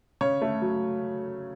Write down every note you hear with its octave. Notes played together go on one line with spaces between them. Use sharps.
C#3 C#5
A3
F#3